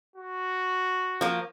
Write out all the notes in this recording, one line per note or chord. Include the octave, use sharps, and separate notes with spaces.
F#4
F3 A#3